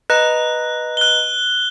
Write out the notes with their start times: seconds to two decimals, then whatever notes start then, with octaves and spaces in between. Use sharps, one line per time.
0.10 B4 D#5 A#5 F#6
0.97 F#6 G7